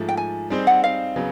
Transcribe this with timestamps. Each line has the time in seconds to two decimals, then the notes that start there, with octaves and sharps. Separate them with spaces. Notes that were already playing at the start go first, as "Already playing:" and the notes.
Already playing: G#2 F3 A3
0.09 G5
0.17 G#5
0.50 G3 C4 D#4 G#4 C5
0.67 F#5
0.84 F5
1.16 C#3 F#3 B3